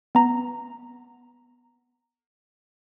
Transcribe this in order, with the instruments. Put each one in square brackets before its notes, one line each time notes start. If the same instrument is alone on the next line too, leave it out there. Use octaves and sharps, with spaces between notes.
[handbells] B3 A#5